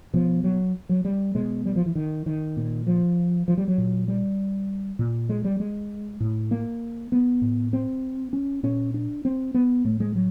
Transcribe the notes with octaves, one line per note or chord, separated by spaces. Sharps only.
B2 F3
F#3
F#3
G3
B2 G#3
G3
F3
E3
D#3
D#3
A#2
F3
F3
G3
F#3
A#2
G3
A#2
G#3
G3
G#3
A2
A#3
B3
A2
C4
C#4
A#2 C#4
D4
C4
B3
A2 A3
G#3
F#3